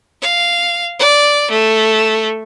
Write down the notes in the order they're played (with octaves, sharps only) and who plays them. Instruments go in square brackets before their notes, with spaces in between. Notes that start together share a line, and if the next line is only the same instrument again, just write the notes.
[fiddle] F5
D5
A3